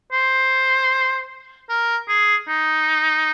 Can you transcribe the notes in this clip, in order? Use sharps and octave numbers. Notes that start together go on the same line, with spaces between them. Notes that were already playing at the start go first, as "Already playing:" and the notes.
C5
A#4
G#4
D#4